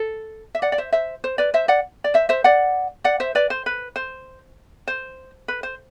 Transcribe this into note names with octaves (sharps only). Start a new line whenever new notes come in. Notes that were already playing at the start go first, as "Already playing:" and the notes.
Already playing: A4
E5
D5 F#5
D5
C5 E5
C5 E5
C5
B4 D5
C5 E5
D5 F#5
D5
C5 E5
C5 E5
D5 F#5
D5 F#5
C5 E5
B4 D5
C5
B4
C5
C5
B4
C5